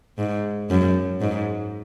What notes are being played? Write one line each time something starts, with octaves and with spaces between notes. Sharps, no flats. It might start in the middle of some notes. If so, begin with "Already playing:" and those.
G#2
F#2
G#2